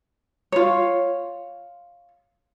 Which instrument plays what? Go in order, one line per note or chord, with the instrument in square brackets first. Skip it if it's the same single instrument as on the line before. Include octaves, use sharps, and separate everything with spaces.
[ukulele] F4 C#5